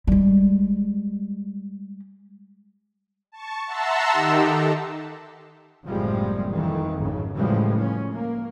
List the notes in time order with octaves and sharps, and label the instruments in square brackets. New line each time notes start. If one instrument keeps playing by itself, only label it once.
[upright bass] G3 G#3
[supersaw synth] A5 C#6
E5 F#5 A5 A#5 C6 E6
D#3 D#4 G4
A4
[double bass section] F#1 A2 C3 F3 G3 G#3
F2 D#3 E3
G#1 C#3
A2 C#3 E3 F3 G3 G#3
C#4
A#3